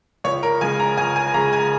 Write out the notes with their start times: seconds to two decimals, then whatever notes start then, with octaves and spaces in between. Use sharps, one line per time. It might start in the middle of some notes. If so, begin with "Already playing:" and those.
0.24 C#2 C#5
0.43 A#4
0.61 C#3 G#3 G#5
0.79 A#5
0.97 C#2 G#5
1.16 G#5
1.34 C#3 G#3 A#5
1.53 G#5